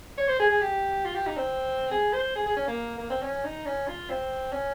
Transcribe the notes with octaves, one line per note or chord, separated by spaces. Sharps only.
C#5
C5
G#4
G#4
G4
F4
G4
D#4
C4
G#4
C5
G#4
G#4
C#4
A#3
A#3
C4
C#4
D#4
C#4
F4
C4
C#4